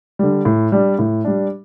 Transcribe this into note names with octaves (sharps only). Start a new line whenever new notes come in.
D3 G3
A2
G3 D4
A2
G3 D4